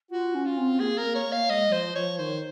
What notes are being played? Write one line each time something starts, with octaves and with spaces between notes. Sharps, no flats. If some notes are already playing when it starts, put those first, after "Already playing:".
F4 F#4
C#4
F4
C4
A#3 G#4
A#3 A#4
C#5
A#3
F5
G#3 D#5
F#3
F3 C5
F3 C#5
D#3 C5